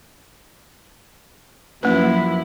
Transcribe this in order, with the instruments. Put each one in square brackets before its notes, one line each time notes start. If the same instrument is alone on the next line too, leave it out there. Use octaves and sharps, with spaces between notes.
[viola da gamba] F#2 F3 E4 [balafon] A#3 C#4 B4